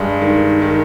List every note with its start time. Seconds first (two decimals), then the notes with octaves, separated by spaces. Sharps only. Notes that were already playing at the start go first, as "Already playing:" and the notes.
Already playing: G2 G#3
0.22 D#3
0.62 D#3